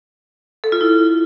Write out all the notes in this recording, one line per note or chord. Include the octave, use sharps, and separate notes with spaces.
A4
F4
E4